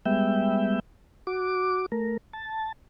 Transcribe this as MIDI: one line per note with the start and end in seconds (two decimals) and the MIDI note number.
0.06 0.79 55
0.06 0.79 56
0.06 0.79 59
0.06 0.79 76
0.06 0.79 79
1.27 1.86 66
1.27 1.86 86
1.92 2.17 57
1.92 2.17 70
2.33 2.72 81